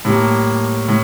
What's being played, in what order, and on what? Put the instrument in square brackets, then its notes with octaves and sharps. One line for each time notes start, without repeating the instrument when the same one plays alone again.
[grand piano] A2 G3 A#3
A2